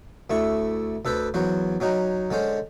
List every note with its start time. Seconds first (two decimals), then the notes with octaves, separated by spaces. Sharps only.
0.30 D2 A3 E4 C#6
1.05 D2 A4 B4 C5
1.34 E2 F#3 F#4 C5
1.80 F#3 C#4 D#4 F#4
2.31 D3 G#3 C#4 C5